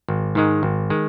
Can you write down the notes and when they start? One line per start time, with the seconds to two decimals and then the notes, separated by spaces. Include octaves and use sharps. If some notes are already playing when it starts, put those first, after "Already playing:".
0.08 G#1
0.35 G#2 D#3 G#3
0.63 G#1
0.90 D#3 G#3